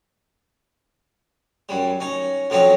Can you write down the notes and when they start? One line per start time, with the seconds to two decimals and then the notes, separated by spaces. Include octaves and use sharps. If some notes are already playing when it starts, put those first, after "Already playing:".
1.69 F#2 G3
2.00 C#4 D#4
2.50 F2 F3 F#3 C4 C#4 D#4